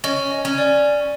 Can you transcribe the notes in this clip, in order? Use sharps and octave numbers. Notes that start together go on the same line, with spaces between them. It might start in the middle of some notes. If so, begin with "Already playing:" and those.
C#4 D#5
D#5
C#4
D5